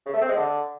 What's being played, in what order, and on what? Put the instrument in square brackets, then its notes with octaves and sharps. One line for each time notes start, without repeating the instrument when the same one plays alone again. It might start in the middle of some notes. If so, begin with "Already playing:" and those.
[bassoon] C#3
A3
C4
G#3
D3